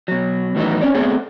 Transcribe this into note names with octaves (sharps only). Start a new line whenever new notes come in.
B2 F#3
A2 D#3 E3 F#3 B3 D#4
C4 C#4 C#5 D5
A3 B3 C4 G#4